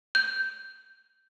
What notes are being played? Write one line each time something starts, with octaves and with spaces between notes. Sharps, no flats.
G6